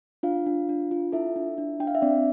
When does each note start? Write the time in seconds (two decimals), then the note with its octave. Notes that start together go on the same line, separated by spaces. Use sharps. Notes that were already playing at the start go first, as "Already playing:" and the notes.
0.23 D4 F4 F5
0.46 D4
0.69 D4
0.91 F4
1.12 E4 A4 E5
1.36 D4
1.58 D4
1.80 D4 G5
1.87 F5
1.95 E5
2.02 C4 D4 D5